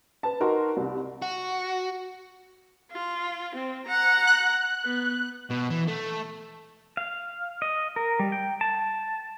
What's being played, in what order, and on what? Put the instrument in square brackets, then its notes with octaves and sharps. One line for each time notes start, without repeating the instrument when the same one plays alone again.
[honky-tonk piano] B4 A5
D#4 F#4 A#4 B4 C6
C2
[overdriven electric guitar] F#4
[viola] F4
C4
F#5 A#5
[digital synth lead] F#6
[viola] B3
[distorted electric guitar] B2
E3
A3
[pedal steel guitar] F5
D#5
A#4
G3
G5
A5